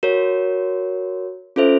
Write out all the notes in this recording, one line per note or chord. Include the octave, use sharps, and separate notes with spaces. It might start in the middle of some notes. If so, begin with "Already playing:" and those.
F#4 A#4 C#5
C#4 F4 A4 C5 E5